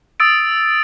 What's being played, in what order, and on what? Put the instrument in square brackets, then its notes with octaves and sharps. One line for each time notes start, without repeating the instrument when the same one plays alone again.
[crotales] D#6 E6 A6 D7